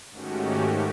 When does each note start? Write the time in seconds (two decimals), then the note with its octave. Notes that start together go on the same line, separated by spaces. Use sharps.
0.11 G#2 D#3 A3 C#4 F#4 G4